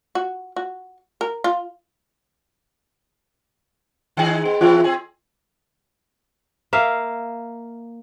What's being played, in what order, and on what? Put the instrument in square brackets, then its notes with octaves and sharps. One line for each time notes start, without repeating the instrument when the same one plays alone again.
[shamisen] F#4
F#4
A#4
F4
[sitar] D#3 D#4 G#4
B3
[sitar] E3 B3 E4 [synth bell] F4
[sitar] C4 G#4
[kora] A#3 E5 F5